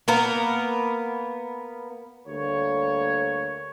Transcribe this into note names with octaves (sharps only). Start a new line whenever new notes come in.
A#3 B3 A#4
D2 G3 A#3 C#5